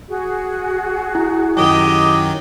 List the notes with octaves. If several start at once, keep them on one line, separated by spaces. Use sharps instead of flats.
F#4 G#4
E4
F#2 D#3 F#3 G4 D#5